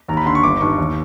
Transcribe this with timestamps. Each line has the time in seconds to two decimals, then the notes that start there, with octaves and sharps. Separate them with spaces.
0.08 D#2 A#5
0.17 B5
0.26 D3 C6
0.35 C#6
0.43 G1 D6
0.61 G2 D#3 C#6
0.78 D#2